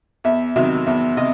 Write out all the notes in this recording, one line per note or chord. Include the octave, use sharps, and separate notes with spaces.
E2 E5
C3 D#3 F#3 E5
E2 E5
C3 D#5